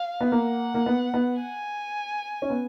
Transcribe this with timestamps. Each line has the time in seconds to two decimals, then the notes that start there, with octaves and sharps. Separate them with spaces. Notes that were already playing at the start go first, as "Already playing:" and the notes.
Already playing: F5
0.21 B3
0.31 A#3 F#5
0.74 A#3
0.86 B3
1.14 B3
1.41 G#5
2.42 C#4
2.50 B3